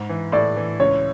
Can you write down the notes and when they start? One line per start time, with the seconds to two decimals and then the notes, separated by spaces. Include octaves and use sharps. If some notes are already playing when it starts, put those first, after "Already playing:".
Already playing: G#2
0.09 E3
0.32 A2 D5
0.57 E3
0.80 C#2 C#5